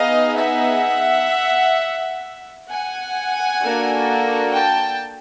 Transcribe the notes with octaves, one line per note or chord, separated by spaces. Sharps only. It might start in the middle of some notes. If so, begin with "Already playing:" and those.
Already playing: B3 D#4 G#4 D#5 F5
E5 F#5
F#5 G#5
A#3 D4 F#4 A4
G5 A5